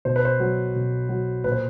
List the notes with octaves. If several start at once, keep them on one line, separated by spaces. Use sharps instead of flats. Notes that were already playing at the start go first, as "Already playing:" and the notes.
B2 C5
B4
C5
F#3
B2
F#3
A#2 B4
C5